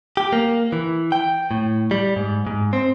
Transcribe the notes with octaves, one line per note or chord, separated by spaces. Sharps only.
G4
A#3
E3
G5
A2
G3
G#2
G#2
C4